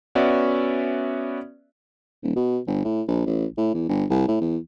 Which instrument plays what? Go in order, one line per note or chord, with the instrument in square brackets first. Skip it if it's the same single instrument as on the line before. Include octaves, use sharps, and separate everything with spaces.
[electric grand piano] B3 C#4 F#4 D5 E5
[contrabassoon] D#1
B2
G1
A2
A#1
A1
A2
E2
G1
C2
A2
E2